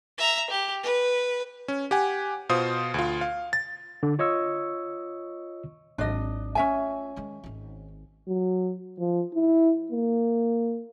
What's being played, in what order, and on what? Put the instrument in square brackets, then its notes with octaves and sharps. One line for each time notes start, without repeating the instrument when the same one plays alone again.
[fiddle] E5 A#5
G4
B4
[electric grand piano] C#4
G4 F#5 G#5
B2 F4 C5 D#6
D2 F4
F5
A6
[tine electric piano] D3
F4 C#5 D#5 C#6 E6
[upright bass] G#1 F#3 [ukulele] D4 D#5
[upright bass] A3 F4 [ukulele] C#4 E5 G#5
[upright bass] D#3 G#3
G#1 D#3
[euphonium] F#3
F3
E4
A#3